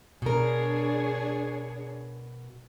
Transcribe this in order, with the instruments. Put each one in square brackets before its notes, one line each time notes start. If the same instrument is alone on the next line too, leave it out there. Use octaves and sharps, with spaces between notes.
[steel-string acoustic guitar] B2 A#4 [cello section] D4 G#4 C#5